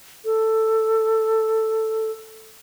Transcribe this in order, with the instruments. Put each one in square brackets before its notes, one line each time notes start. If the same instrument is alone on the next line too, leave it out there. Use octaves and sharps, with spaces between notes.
[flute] A4